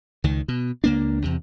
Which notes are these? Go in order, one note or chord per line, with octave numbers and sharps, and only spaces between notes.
C#2 D#3
B2
C#2 A#3 D4
E2 C3